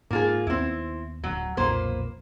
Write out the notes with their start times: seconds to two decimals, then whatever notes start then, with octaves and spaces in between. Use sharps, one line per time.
0.11 G#2 A#3 F4 G#4
0.47 D#2 B3 C4 E4
1.24 D1 F#3
1.57 B1 F2 A#2 A#3 B4 C5